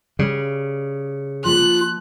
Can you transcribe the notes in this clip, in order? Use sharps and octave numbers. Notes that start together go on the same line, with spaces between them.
C#3 G3
F3 A#3 F4 F#6